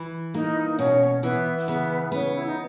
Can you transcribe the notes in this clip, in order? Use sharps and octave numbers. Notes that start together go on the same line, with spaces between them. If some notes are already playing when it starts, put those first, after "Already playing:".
Already playing: E3
A#3 D#4
D#4
B2 C#4
E3 B3
C#3 B3
B3 C#4
E4
D#4